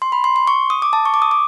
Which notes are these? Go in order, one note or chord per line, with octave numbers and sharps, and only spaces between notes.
C6
B5
C6
C6
C#6
D#6
D6
A5
C#6
D6
D#6
D6